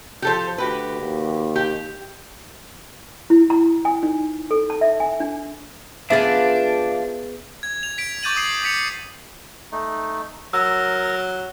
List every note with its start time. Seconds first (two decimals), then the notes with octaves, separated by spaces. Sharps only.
0.22 F3 G4 A4 C5
0.58 D2 F#4 G4 B4
1.00 D#2
1.56 G4
3.30 E4
3.50 A#5
3.85 G#5
4.03 D#4
4.51 A4
4.70 A5
4.81 E5
5.00 G#5
5.20 D4
6.10 F3 B3 D4 F4 G#4 B4 E5 A6
7.63 G#6
7.83 F7
7.98 B6 D7
8.23 C#6 D6 G6 A6 D#7 F#7
8.36 D#6 C7 F#7
8.63 D6 B6 C#7 F7
9.72 A3 D#4
10.53 F#3 A#4 E6